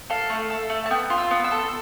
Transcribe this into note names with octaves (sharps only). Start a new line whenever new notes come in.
A4 F5
A3
A4
A3
A5
B3 G5
F4
E6
B3
E6
A4